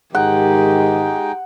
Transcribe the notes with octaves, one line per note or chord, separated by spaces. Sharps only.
G#2 D#3 G#3 D#4 G4 F#5 G5